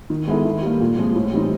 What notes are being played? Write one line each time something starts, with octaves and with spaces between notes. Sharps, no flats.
D#3
G#3 B3 E4 A4
D#3
G3 A#3
A#2
F3 G#3 C4
A2
E3 G3 C4 D#4